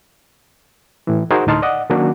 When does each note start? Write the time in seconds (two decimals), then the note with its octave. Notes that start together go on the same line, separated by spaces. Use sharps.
1.07 A2 E3
1.31 D#4 F#4 G#4 A#4 C5
1.47 D2 A2 D#4 A5 C6 F6
1.62 D5 D#5 F#5
1.90 D#3 F#3 A#3 C#4 D4 F#4